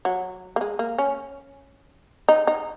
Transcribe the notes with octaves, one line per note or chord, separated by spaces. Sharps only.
F#3
A#3
G#3
A#3
C#4
D#4
D#4